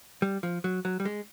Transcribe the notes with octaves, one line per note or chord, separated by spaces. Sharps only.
G3
F3
F#3
F#3
G3
G#3